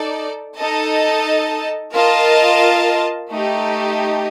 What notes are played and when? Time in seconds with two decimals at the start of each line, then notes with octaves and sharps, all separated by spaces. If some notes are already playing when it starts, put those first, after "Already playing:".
Already playing: D#4 A4 D5
0.57 D#4 A4 D#5 A5
1.94 F4 A#4 D#5 A5
3.31 A3 D#4 G4